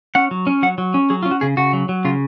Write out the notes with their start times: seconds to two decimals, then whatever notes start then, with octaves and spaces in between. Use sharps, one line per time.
0.15 C#4 F#5
0.31 F#3
0.47 C#4
0.63 F#3 F#5
0.78 F#3
0.94 C#4
1.10 F#3 G#4
1.23 C#4 F4
1.31 F#4
1.41 C#3 G#4
1.57 C#3 F#4
1.73 F#3
1.89 F#3
2.05 C#3 F4